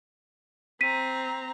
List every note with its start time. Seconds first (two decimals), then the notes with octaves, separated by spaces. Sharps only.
0.81 C4 A#5 B6 D#7